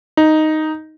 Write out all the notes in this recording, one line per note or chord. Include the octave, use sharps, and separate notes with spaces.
D#4